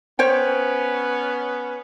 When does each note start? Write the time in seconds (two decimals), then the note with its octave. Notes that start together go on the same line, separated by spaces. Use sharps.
0.19 B3 C#4 C5 C#5 G5